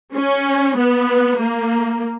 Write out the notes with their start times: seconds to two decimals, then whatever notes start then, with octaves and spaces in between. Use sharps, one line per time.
0.16 C#4
0.77 B3
1.39 A#3